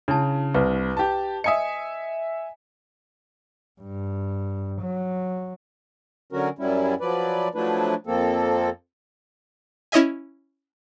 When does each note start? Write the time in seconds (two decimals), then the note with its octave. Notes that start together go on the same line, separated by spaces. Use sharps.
0.08 C#3 D4 E4 A5
0.54 C2 B4
0.97 G4 A5
1.44 D#5 E5 G#5 D#6 C#7
3.81 G2
4.81 F#3
6.32 D3 F#3 C#4 F#4 A#4
6.59 F#2 F#3 G3 C#4 E4
7.01 F3 F#3 B4 D5
7.55 F3 F#3 A3 D4 E4 B4
8.07 F2 F3 A#3 C4 A4
9.92 C#4 E4 C#5 D#5 E5 G#5